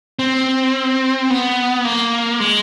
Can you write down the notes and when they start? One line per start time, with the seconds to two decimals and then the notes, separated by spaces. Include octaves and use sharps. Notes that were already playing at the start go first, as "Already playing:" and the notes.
0.19 C4
1.30 B3
1.85 A#3
2.40 G#3